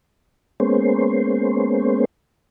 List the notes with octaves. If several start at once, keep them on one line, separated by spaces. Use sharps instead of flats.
G#3 A#3 B3 C#4 C5